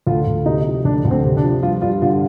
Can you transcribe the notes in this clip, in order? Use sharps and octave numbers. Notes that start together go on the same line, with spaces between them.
D2 F4
D2
C3 D#4
F3
D2 D4
D2
C4
C3
D4
F3
G2 F4
G2 F4
D3 F4